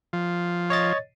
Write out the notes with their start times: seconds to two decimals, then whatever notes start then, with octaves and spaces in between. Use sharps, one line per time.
0.13 F3
0.70 C#5 D#5 A6